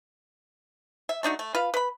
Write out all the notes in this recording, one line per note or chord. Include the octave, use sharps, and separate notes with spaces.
E5
A3 D4 D#4 F#4
A3
F4 B4 F5
B4 B5